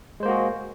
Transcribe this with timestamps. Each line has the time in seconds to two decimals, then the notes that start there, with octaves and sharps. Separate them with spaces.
0.20 G#3
0.23 C5
0.26 A#3
0.28 F#4
0.31 G#4